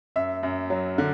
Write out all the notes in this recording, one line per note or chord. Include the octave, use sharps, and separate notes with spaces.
F#2 E5
F#2
F#3
D3